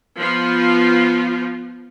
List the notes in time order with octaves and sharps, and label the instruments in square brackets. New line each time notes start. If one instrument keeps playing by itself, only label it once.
[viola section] F3 B3 F4